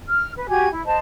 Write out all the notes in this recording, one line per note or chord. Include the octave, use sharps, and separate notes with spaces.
F6
B4
F#4 G4 G#5 G#6
E4
C5 D#5 A5